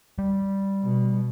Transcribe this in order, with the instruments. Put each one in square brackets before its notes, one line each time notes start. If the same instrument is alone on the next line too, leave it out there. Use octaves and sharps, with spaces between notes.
[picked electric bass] G3
[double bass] B2